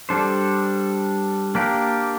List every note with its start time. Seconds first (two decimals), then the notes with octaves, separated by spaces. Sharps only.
0.09 G3 D4 A4 C5
1.55 A#3 D4 G4 A#4